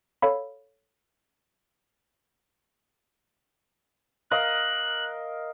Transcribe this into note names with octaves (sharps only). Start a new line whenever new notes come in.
A4 C#5 F5 B5
A#4 D#5 F5 F#6